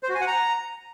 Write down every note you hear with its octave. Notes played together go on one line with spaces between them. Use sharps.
C5
F#4
G#5
F#5
A#5